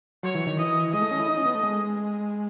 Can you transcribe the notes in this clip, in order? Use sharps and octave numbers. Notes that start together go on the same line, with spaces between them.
F#3 C#5
E3
D#3
E3 D#5
G#3 D#5
A3
C#4
E4
D#4
C#4
B3
A3
G#3